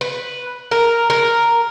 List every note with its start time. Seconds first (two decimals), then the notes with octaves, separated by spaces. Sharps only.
0.01 B4
0.71 A#4
1.10 A#4